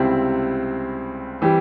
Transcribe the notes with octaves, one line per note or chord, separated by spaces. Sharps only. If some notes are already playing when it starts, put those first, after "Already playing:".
Already playing: C#2 C3 G3 C4 E4
E3 G3 C4 G4